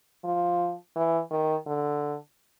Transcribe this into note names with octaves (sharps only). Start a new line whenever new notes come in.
F3
E3
D#3
D3